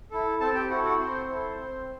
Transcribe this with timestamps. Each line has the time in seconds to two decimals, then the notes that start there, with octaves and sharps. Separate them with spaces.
0.11 E4 A4
0.40 C4 A4 A5
0.55 G4 G5
0.70 E4 F#4 A4 F#5
0.84 F#4 F#5
0.99 C4 C5
1.29 E4 A4
1.59 C4